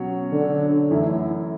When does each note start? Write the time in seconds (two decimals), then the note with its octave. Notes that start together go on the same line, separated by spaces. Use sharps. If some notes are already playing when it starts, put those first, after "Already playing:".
Already playing: B2 F#3 C#4 C#5
0.32 D3
0.91 F#2 E3 A3 E4